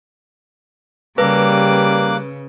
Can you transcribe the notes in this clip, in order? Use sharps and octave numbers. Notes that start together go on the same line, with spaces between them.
C#3 G3 A#3 B4 D6 F#6